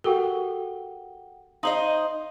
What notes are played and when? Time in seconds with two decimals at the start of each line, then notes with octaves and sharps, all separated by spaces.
0.04 F#4 G4 A4 A#4 F#5 G5 G7
1.63 D#4 C5 D#5 F5 C6 F#7